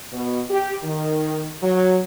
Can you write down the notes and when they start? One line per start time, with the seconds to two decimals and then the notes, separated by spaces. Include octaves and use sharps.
0.13 B2
0.50 G4
0.83 D#3
1.62 F#3